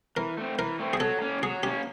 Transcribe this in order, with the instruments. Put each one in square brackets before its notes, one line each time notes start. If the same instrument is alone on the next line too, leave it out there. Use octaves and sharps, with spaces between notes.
[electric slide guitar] E3 [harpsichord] A#4
[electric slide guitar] A3 C4
[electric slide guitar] E3 [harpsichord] A#4
[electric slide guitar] A3 C4
[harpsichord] G#4
[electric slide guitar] F#3 [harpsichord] A4
[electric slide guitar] A#3 C#4
[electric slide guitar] F#3 [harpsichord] G#4
[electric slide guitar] A#3 C#4 [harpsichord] G4